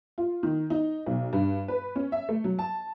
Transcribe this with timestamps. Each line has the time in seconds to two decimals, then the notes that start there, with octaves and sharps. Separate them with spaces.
0.18 F4
0.43 D#3
0.70 D#4
1.06 B1
1.33 G2
1.68 B4
1.96 C#4
2.12 E5
2.29 A3
2.44 F#3
2.59 A5